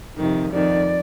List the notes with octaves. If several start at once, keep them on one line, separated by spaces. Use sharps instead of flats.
F2 C3 D#3
F2 D#3 D5